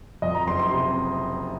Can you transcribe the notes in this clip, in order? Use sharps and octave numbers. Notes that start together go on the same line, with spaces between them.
F2 D#5
A#5
F#1 C6
C6
C3